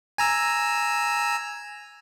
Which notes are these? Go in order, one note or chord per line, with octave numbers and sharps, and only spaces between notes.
G#5 A#5 E6